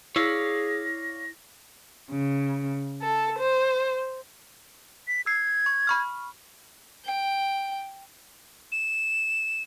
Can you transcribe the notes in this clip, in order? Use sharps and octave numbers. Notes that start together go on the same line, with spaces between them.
E4 G#4 C#5 D5 F5 A#6
C#3
A4
C5
B6
E6 G#6 C7
C#6
B5 C#6 F6
G5
E7